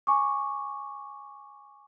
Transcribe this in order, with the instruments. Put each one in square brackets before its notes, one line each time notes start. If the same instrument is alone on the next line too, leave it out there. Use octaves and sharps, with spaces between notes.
[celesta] G#5 C#6 D6